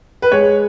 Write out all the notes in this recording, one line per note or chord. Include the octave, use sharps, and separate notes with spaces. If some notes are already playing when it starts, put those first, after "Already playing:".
B4
G#3 C#5